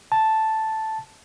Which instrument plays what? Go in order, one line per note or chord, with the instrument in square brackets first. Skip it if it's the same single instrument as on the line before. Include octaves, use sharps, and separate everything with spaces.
[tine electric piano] A5